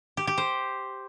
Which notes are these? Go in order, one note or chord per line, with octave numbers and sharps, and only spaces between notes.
G4
G4
C5